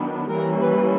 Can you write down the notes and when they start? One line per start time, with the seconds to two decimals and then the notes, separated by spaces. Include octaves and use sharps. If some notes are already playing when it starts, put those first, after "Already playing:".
Already playing: D#3 F#3 B3 D4
0.30 E3 G3 A#3 C#4 A#4
0.61 B4